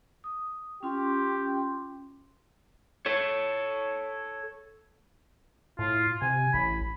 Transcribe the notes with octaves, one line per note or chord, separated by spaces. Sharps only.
D#6
C#4 F4 G4 C6
A4 C#5
A2 F4
C3 G#5
A1 B5